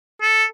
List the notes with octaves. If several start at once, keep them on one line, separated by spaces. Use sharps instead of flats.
A4